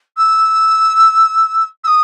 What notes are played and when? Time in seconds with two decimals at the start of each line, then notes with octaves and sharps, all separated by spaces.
0.17 E6
1.84 E6
1.87 D#6